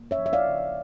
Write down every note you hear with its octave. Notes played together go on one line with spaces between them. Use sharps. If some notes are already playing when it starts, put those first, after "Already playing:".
Already playing: A#3
C#5 E5
F3
E5
D5 F5
C#3